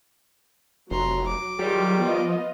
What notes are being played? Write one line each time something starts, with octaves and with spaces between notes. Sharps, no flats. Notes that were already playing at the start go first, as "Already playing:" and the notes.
F1 F#3 A#5 C6
D6
D#3 F#3 G3 F4 G4 G#4
F3 B3 F4 D#5